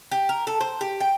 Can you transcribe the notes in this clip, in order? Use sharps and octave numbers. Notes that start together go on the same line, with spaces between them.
G4
A#4
A4
C5
G4
G5